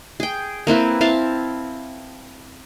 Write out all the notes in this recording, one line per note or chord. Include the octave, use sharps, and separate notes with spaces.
G#4 G5
A#3 C4 E4 B4
C4 E4 F5 A5